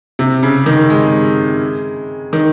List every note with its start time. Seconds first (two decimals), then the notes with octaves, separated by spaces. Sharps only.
0.19 C3
0.43 C#3
0.66 D#3
0.90 G#3
2.33 D#3